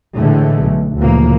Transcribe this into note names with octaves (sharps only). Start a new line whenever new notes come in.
A2 D3 E3 G#3 A3
B1
D2 A#2 C#3 E3 F3 A#3